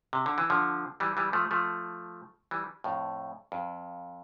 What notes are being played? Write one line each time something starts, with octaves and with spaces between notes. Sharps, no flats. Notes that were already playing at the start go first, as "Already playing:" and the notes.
C3
D3
E3
D3 F3
E3 G3
E3 G3
F3 A3
F3 A3
E3 G3
F2 A2
F2